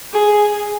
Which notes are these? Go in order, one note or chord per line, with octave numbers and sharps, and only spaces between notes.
G#4